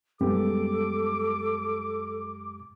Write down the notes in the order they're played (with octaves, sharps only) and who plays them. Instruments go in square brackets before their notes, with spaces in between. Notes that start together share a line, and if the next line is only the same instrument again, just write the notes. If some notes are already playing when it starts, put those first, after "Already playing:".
[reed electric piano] F#2 G#3 G4 [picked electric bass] G3 B3 C#4 [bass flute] A4 [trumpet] D6